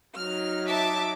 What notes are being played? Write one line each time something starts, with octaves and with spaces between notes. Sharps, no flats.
F#3 D#4 F6
E5 A5 D6